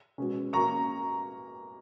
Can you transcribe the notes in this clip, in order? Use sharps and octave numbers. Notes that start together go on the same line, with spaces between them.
B2 G#3 C#4
B2 A#3 C#4 A#5 C#6